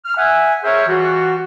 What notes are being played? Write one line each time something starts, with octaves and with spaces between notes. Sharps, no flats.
F6
E5 F#5 G#5
G#4 A#4 C5 C#5 E5
E3 G3 F4 F#4